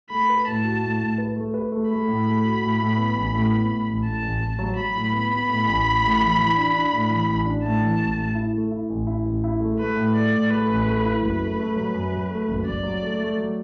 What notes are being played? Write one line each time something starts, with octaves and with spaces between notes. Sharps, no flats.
A3 B5
B4
A2 A5
F#4
A2
A2
B4
A3
B4
A3
A3 B5
A2
A3
F#4
A2
A2
B3
A1
A2
B3
A2
A1
A2 A5
A1
A1
F#3
F#3 B5
A2
B3
B3
A2
A1
A1
A2
E3
E3
D4
D4
A2
E3
A1
D4
A2 A5
E3
A1
A2
E4
A3
E4
A1
E4
A1
E4
A3
A3 B4
A2
A3 D5
A2
A3 B4
A1
A3
E4
F#1 B4
A3
A3
F#3
F#2
F#3
A3
F#1
F#1 D5
F#3
A3
A3
F#3